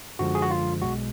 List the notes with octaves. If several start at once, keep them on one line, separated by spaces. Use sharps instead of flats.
F#2 D3 F3 G#3 F#4
G#4
F#4
F4
B1 B2 G#3 F#4